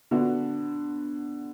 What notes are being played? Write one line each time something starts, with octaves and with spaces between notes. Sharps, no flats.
D3 B3 D4 F#4